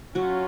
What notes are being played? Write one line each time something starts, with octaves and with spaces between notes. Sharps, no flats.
F#3 C#4 F4 F#4